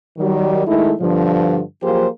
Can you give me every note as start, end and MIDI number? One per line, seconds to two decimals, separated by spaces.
0.18 0.63 51
0.18 0.63 54
0.18 0.63 55
0.66 0.93 51
0.66 0.93 56
0.66 0.93 57
0.66 0.93 63
0.66 0.93 64
1.00 1.61 43
1.00 1.61 47
1.00 1.61 50
1.00 1.61 53
1.83 2.07 53
1.83 2.07 54
1.83 2.07 58
1.83 2.07 67
1.83 2.07 68
1.83 2.07 72